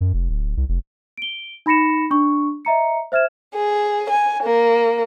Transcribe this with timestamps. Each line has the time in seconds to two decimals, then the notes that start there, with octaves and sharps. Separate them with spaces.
0.01 F#2
0.13 F1
0.29 D1
0.57 C2
0.69 F1
1.17 D7 G7
1.66 D#4 B5 A#6 C#7 E7
2.11 D4 C#6
2.65 D#5 E5 A#5 C#7
3.12 C5 E5 F6 G#6 E7
3.55 G#4
4.09 G#5
4.43 A#3